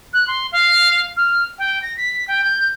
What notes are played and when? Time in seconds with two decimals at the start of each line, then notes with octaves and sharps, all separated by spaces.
0.14 F#6
0.28 C6
0.52 F5
1.17 F6
1.59 G5
1.82 A#6
1.97 B6
2.28 G5
2.44 G6